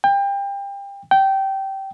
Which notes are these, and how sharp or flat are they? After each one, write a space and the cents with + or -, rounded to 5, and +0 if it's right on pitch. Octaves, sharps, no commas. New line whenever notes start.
G5 +30
G5 -15